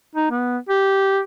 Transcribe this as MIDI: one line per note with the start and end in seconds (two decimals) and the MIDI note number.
0.15 0.28 63
0.31 0.58 59
0.69 1.19 67